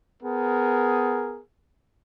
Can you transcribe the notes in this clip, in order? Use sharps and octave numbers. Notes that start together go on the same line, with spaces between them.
B3 G#4 A#4